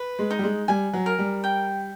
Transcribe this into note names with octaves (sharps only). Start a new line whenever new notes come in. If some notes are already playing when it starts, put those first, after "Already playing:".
Already playing: B4
G#3
D#4
G3
G#3
G3 G#5
F#3
A#4
G3
G5